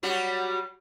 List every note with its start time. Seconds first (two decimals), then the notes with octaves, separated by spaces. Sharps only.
0.03 F#3 G3 F#4